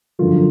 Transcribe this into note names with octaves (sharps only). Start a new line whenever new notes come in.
F#2 D3 F3 F4